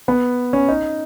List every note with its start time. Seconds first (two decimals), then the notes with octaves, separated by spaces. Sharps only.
0.08 B3
0.53 C#4
0.68 D#4